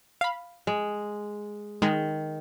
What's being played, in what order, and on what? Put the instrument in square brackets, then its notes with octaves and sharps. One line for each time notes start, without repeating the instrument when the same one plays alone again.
[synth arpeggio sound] F5 B5
[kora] G#3
[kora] D#3 [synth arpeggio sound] G#3